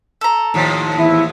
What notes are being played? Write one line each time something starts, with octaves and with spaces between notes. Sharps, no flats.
A4 A#5
D#2 A2 F3
E2 E4 E5